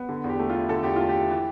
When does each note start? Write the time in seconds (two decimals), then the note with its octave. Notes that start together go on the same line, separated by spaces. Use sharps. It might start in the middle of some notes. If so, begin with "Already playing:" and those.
Already playing: B3
0.09 D3
0.24 E2
0.29 G4
0.39 A3
0.50 F4
0.55 E4
0.69 D3 A4
0.83 E2 G4
0.96 A3 F4
1.09 G4
1.15 E4
1.30 E3